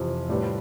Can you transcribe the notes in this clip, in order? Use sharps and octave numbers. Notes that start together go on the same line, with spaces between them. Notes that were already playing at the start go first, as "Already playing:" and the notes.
Already playing: F2 C3 E3
A2 G3 D4 F4 B4